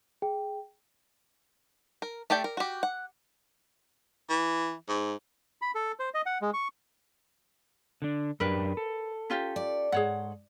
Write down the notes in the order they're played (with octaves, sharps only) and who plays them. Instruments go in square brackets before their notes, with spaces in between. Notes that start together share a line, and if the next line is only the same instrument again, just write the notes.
[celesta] G#4 G5
[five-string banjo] A#4
A3 G4 D5 G5
A#4
F#4 G4
F#5
[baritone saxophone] E3
G#2
[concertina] B5
A4
C5
D#5
F#5
G#3
C#6
[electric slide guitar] D3 D4
[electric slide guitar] F#2 D4 G4 [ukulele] A#4 B4
[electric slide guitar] A4
[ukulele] C#4 F4 G4
[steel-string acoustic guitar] D5
[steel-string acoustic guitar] G#2 [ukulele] G#4 C#5 F#5